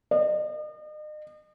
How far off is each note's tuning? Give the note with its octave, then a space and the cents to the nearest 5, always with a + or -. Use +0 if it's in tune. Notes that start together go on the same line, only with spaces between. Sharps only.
D#5 -40